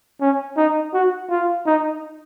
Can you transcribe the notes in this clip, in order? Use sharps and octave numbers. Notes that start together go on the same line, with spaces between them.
C#4
D#4
F#4
F4
D#4